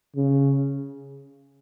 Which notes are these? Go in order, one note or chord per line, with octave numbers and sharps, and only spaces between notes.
C#3